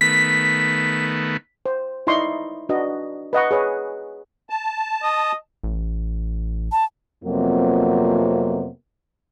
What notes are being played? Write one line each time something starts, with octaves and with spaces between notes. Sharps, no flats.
D#3 A3 B3 B6
C5
D#4 E4 D5 D#5 C6 C#6
D4 F#4 B4 D#5
B4 D#5 F#5 C#6
G#4 B4 C#5
A5
D#5
A1
A5
F2 C3 F3 F#3 A#3 B3